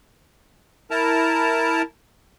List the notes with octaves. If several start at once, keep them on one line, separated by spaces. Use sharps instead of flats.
E4 A#4 A5 A#5